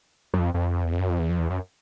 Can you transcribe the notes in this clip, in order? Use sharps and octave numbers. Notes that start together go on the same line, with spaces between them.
F#2
F2
F2
E2
F2
F#2
F2
E2
F2
E2
F#2